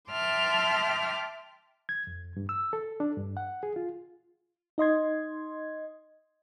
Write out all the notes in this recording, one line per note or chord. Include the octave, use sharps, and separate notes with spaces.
E5 G5 A5 C6 D6 F6
G#6
F2
G2
E6
A4
D4
G2
F#5
G#4
F4
D#4 D#5 C6 G#6